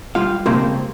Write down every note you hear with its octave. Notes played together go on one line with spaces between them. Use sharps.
G3 F4 F5
C#3 F3 G3 G#3 A#3 C4